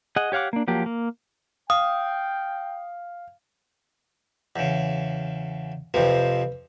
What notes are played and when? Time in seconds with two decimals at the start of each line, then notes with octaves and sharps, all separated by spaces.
0.16 G#4 D#5 F#5
0.32 G4 C#5 F5 F#5 D6
0.53 A#3 D4
0.68 F3 F#3 A#3 G4
0.86 A#3
1.70 F5 G5 D#6
4.56 E2 C#3
5.94 F2 C3 F3 B4